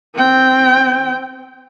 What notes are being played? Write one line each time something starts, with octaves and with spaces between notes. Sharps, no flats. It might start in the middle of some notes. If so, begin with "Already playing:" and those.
C4 G5